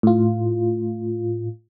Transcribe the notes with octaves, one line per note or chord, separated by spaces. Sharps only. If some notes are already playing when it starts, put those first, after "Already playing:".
A2 F4